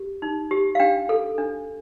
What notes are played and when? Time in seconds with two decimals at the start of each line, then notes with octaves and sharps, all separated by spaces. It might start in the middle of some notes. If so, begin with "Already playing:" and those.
Already playing: G4
0.22 D#4
0.51 G4
0.75 F5
0.80 D4 G5
1.09 A4
1.38 D4